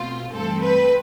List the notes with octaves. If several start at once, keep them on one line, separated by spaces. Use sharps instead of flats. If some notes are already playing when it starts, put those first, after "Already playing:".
Already playing: B2 A3 C4 F4
G2 E3 A3 C4 A4
B4